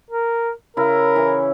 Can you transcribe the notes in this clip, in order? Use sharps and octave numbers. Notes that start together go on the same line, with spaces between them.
A#4
C#3 E4 A#4
E3 C#4